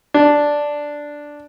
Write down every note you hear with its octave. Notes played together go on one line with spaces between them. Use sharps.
D4